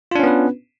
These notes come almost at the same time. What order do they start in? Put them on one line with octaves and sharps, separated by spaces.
F4 D4 C#4 B3 B4